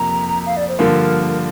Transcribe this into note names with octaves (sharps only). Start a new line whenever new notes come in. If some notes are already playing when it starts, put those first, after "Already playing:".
Already playing: F2 C3 A#3 A#5
F5
D5
C5
G2 D3 F3 A#3 F4 A#4